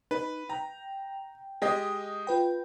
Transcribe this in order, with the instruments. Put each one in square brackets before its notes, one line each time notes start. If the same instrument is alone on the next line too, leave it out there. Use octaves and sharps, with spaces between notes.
[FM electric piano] D#4 [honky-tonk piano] B4
[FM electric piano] G5 [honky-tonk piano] A#5
[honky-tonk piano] G#3 G4 D#5
[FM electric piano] F4 B4 G5